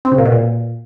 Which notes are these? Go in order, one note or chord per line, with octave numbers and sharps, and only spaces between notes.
C4
C#3
A#2
B2
A#2